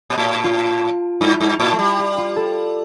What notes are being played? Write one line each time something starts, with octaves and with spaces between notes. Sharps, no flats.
A#2
A2
F4
G2 E4
G2
A2 E4
A3
G3
F4
F4
A4